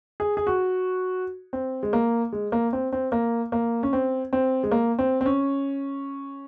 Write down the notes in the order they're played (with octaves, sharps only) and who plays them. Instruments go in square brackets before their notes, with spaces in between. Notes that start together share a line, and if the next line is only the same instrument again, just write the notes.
[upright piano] G#4
G#4
F#4
C4
G#3
A#3
G#3
A#3
C4
C4
A#3
A#3
C#4
C4
C4
G#3
A#3
C4
C4
C#4